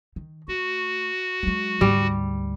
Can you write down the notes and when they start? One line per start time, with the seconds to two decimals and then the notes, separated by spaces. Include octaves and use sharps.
0.16 D#3
0.48 A3 F#4
1.43 F#3 G#3
1.81 D2 G#2 G3